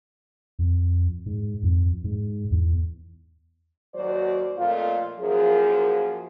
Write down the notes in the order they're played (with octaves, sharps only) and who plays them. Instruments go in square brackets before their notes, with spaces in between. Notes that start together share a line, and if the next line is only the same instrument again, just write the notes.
[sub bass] F2
G#2
F2
G#2
E2
[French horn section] D#2 F#3 F#4 C5 D5
F2 A#2 A3 F4
F#2 F3 A#3 G#4